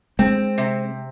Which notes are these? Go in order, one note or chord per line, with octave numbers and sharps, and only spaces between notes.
G#3 C4
C3